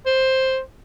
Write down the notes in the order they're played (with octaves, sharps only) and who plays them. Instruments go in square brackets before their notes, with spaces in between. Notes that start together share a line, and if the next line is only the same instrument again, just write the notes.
[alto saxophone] C5